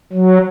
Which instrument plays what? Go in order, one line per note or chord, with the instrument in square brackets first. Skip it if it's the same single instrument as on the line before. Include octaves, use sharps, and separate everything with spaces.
[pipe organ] F#3